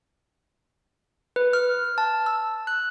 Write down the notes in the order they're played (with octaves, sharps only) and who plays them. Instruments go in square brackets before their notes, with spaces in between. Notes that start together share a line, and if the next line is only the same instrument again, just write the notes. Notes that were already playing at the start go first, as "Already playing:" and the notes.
[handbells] B4
F6
A5
E6
F#6